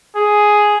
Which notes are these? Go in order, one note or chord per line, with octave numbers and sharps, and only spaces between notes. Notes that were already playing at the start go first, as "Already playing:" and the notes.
G#4